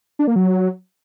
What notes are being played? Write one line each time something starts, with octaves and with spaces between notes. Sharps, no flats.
D4
A#3
F#3